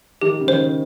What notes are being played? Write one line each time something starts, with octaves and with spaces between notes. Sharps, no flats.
D#3 G4
C#3
D#3 C5